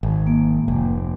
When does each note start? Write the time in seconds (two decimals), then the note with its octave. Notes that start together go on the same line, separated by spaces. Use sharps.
0.03 G#1
0.27 A#3
0.68 F1